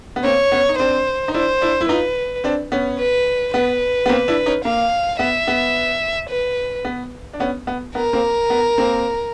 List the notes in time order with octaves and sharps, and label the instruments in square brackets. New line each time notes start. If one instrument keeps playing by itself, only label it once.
[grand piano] B3
[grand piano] A#3 C4 [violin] C#5
[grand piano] B3 C#4
D#4
[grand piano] C4 D4 [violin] C5
[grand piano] D#4
[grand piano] D4 E4 [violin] C5
[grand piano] D4 E4
E4
[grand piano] D#4 F4 [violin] B4
[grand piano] C4 D4
B3 C#4
[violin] B4
[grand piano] B3 [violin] B4
[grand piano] B3
A#3 C4
D4 E4
C#4 D#4
[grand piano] A#3 [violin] F5
[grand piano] B3 [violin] E5
[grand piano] B3
[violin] B4
[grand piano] B3
D4
B3 C#4
B3
[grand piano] B3 [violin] A#4
[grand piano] A#3 C4
B3
A#3 C4